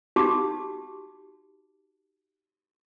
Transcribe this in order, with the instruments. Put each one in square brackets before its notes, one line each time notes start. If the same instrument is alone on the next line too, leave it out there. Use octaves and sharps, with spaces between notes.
[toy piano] D#4 F#4 G4 A5 D6